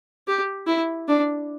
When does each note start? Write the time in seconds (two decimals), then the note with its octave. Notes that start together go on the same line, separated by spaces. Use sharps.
0.28 G4
0.67 E4
1.08 D4